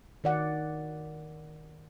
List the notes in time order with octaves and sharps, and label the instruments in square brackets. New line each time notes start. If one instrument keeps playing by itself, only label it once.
[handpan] D#3 D5 F#5